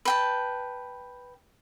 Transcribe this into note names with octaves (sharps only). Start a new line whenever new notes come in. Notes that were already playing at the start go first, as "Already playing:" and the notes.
B4 G5 A5